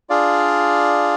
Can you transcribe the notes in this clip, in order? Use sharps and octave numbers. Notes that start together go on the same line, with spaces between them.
D4 F4 G#4 D5 F5